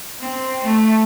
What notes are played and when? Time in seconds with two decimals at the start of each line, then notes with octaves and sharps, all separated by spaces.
0.20 C4
0.63 A3